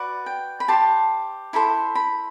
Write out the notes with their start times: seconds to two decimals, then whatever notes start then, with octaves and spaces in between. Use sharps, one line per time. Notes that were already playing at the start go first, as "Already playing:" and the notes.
Already playing: F#4 B4 D5
0.26 G5
0.60 B5
0.68 G4 C5 A5
1.53 E4 A4 C5 B5
1.95 B5